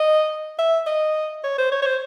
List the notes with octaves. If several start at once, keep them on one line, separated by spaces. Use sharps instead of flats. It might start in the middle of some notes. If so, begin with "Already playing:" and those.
Already playing: D#5
E5
D#5
C#5
C5
C#5
C#5
C5